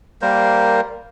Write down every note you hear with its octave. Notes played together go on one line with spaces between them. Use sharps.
G3 A#3 A#4 C5